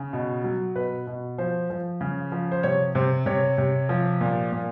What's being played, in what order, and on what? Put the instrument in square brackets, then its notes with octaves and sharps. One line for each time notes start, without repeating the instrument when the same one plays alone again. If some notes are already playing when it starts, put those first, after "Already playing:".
Already playing: [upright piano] C#3
B2
F#3
B2 B4
B2
F3 C5
F3
C#3
F3
C5
C3 C#5
C3 C5
C3 C#5
C3
F3
A#2
A#2